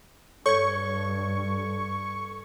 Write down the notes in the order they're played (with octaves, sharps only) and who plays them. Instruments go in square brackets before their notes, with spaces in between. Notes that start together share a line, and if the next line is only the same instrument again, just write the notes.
[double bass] G2 [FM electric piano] A4 G#6 [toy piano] C#5 [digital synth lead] C#6